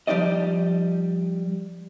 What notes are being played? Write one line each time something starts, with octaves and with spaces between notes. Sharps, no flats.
F3 G3 D#4 D5 D#5